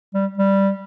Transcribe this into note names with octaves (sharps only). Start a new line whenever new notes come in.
G3
G3